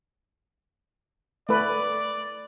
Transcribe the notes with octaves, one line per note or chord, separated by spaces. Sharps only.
A3 B4 D5